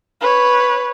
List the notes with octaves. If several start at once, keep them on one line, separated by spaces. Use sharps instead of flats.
B4 C#5